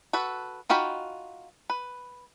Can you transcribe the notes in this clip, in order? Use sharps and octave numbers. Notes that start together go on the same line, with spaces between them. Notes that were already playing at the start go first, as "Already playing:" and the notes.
F#4 A4 B4
D#4 F4 F#4 G5 B5
B4